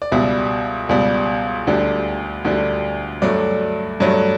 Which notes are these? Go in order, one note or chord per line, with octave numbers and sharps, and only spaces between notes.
D5
C#2 B2 G3 E5
C#2 B2 G3
D2 D3 G3
D2 D3 G3
G2 F#3 A3 D5
G2 F#3 A3